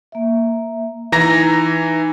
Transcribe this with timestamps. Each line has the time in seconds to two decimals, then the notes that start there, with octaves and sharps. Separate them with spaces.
0.12 A#3 E5
1.12 E3 D#4 A#5 A#6